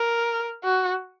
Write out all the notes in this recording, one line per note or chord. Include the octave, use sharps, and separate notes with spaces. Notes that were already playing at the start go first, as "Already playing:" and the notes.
Already playing: A#4
F#4